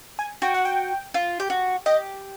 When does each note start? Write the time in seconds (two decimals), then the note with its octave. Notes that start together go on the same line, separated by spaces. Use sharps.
0.19 G#5
0.42 F#4 G5
0.54 F#5
0.65 G5
1.14 F4
1.40 G4
1.50 F#4
1.86 G4 D#5